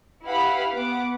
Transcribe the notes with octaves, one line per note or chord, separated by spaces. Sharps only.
E4 G4 B4 F5 F#5 B5
B3 F#5 D6